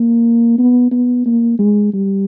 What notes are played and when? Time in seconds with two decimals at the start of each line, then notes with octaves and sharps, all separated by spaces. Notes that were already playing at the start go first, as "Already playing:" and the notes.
Already playing: A#3
0.58 B3
0.91 B3
1.26 A#3
1.59 G#3
1.93 G3